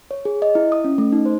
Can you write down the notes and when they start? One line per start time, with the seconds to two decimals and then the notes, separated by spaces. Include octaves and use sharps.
0.11 C#5
0.25 G#4
0.42 D#5
0.55 E4
0.72 D#6
0.84 C#4
0.98 A3
1.12 D#4
1.25 C5